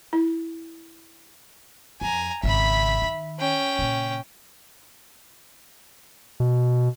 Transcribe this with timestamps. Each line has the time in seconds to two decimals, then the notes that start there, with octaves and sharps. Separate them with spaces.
0.13 E4
2.01 F2 G#5 A#5
2.43 G#1 C#3 E5 B5
3.02 D#3
3.40 C#4 G5
3.78 A#2 C#3
6.40 B2